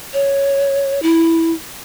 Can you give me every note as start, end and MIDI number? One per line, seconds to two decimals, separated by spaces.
0.13 1.02 73
1.02 1.53 64